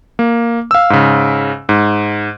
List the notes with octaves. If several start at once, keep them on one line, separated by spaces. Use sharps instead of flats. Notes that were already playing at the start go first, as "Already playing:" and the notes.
A#3
F5 E6
G#2 C#3
G#2